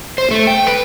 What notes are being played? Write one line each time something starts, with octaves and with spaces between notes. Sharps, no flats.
C5
A3
G5
B4